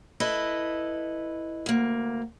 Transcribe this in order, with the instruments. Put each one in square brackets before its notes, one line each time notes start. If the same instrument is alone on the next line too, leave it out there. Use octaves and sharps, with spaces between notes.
[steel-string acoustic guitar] E4 A4 B4 D#5
D2 A#3